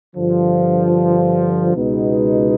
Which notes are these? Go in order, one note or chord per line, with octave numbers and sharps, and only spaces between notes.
G2 D3 F3
C#2 B2 G#3 B3 D#4